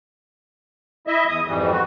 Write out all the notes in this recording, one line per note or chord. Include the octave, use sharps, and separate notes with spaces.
E4 D#5 E5
E2 D#6
F2 G#2 E3 G3
F#4